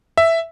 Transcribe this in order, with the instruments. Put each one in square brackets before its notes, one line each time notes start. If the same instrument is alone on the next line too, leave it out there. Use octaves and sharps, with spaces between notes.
[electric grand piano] E5